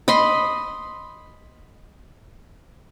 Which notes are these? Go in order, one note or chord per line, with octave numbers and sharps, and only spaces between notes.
D#5 B5 C6